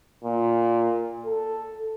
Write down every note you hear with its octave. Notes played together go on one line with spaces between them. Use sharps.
A#2
A4